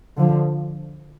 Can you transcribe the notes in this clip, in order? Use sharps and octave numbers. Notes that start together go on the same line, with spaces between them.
D3 F3